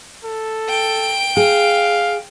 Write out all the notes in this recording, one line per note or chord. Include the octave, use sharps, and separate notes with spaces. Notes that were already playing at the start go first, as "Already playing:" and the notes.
A4
G5 D7
G#4 F5